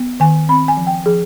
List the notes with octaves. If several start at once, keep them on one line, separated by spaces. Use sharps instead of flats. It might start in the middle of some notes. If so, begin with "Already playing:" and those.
Already playing: B3
D#3 G#5
C4 B5
G#5
F3
G5
F3 G#4